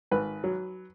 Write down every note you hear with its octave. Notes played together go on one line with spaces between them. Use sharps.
G#1 B4
F#3